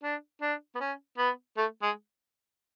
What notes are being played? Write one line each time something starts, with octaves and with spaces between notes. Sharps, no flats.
D4
D4
B3
C#4
B3
A3
G#3